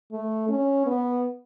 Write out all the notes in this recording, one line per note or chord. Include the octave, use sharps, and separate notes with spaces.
A3
C#4
B3